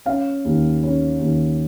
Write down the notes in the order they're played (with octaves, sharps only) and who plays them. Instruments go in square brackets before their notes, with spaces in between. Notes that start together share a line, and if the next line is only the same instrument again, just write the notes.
[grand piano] C#4 F5
D#2
C#4
D#2